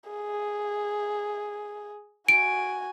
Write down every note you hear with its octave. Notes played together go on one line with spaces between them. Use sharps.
G#4
F#4 G#5 D7